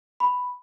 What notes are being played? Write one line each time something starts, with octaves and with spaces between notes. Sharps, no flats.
B5